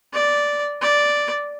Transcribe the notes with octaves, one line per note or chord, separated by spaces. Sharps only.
D5
D5